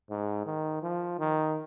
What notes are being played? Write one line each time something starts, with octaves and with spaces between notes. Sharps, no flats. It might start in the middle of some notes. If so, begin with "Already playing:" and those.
G#2
D#3
F3
D#3